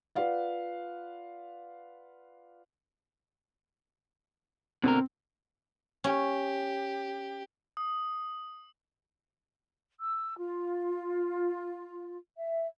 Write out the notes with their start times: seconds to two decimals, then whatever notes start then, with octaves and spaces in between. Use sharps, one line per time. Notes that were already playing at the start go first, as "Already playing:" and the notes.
0.15 F4 B4 D5 F5 F#5
4.84 B2 D3 C4 A#4
6.04 C#4 G4
7.77 D#6
10.00 E6
10.38 F4
12.37 E5